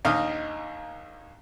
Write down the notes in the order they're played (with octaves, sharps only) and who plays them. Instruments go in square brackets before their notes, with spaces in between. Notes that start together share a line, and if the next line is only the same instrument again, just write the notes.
[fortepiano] A#1 D#2 D#4 D#5 F5